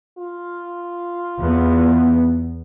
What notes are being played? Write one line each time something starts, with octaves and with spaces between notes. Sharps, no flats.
F4
E2 B3